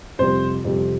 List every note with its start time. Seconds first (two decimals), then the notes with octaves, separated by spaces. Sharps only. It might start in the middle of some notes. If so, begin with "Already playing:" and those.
0.19 F2 C3 G3 C5
0.64 F2 C3 G3